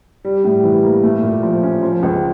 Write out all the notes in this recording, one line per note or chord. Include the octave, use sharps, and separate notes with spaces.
G3
A2
E3
A#3
A3
A#2
F3
C#4
F3
C#2